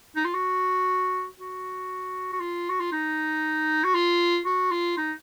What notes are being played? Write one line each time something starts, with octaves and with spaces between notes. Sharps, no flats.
D#4
F4
F#4
F#4
F#4
F4
F#4
F4
D#4
F#4
F4
F#4
F4
D#4